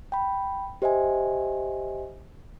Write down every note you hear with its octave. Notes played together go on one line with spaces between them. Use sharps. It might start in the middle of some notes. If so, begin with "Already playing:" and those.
G5 B5
G4 C5 D#5 E5 G#5